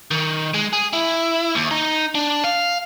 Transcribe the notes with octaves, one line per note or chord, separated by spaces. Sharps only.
D#3
G#3
G#4
E4
D#2
D#4
D4
F5